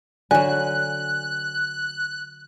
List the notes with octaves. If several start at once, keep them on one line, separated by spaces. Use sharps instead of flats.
D3 F#3 G#5 F#6